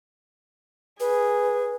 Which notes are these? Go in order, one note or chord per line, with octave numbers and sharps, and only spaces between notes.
G#4 B4